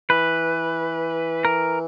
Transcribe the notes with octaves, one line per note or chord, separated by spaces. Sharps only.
E3 B4
A#4